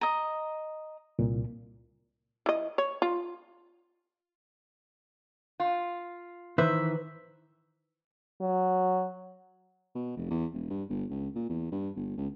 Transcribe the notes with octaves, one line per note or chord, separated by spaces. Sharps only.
D#5 A#5
C2 A#2
E3 D#5
C#5
F4
F4
D#3 E3 B4 C5 E5
F#3
B2
F1
E2
E1
G2
G1
C#2
A#2
E2
G2
G1
C#2